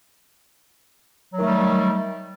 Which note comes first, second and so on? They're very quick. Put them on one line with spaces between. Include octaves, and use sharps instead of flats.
F#3 D#3 A3 G3